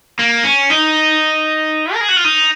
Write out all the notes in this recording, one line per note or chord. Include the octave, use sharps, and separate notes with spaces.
A#3
C#4
D#4
A#4
G#4
F#4
F4
D#4